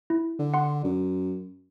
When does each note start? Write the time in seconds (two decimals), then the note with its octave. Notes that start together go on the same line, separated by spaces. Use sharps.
0.10 E4
0.39 D3
0.54 F#5 C6
0.84 F#2